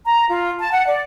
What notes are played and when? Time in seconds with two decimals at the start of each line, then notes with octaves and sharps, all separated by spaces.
0.05 A#5
0.29 F4
0.60 A5
0.73 F#5
0.87 D5